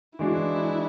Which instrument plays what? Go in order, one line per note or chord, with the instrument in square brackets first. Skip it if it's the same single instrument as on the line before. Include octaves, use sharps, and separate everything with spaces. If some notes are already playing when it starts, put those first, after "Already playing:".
[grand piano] E3 G#3 D4 F#4 [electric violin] E4